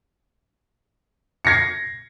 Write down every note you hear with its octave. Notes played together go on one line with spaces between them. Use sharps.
G#6 A#6 C7 C#7